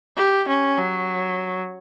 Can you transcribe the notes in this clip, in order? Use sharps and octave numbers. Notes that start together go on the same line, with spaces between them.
G4
C#4
F#3